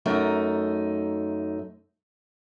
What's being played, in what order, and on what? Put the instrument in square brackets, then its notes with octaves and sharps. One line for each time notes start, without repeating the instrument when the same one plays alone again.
[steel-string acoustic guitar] F#2 A3 D#4